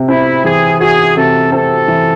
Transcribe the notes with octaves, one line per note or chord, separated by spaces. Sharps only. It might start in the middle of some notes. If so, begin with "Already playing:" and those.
Already playing: C3
C4 E4
E3 G#4
F#4 G#4
C3 A4
C4 A4
E3